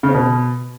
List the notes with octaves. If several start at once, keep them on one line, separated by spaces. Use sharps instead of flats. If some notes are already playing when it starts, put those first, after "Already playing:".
C#3
C4
B2